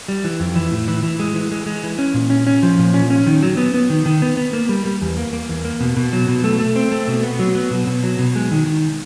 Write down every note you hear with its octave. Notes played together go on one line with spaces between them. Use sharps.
G3
E3
F2
E3
A2
E3
E3
G#3
E3
G#3
G#3
E3
C#4
A#2
C#4
C#4
F3
A#2
C#4
C#4
D#3
F#3
B3
B3
D#3
D#3
B3
B3
A#3
G3
G3
E2
A#3
A#3
E2
A#3
B2
B2
F#3
B2
A3
A3
C4
A3
B2
B3
F#3
B3
B2
B2
F#3
B2
G#3
D#3
D#3